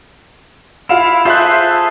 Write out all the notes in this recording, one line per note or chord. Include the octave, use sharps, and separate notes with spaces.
E4 F4 F5 E7
F4 G#4 A4 C5 E5 F#6